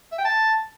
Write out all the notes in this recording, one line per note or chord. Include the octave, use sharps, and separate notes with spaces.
E5
G5
A5